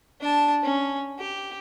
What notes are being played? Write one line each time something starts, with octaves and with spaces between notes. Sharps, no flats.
D4 A5
C#4
G4